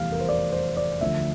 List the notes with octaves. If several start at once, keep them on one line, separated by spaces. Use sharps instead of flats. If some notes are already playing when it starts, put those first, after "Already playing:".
Already playing: F1 E2 E3 G3 F5
A#4
C5
D5
C5
D5
D2 D3 F3 E5